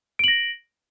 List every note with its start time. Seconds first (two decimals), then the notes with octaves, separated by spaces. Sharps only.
0.19 D7
0.24 F#7
0.28 A#6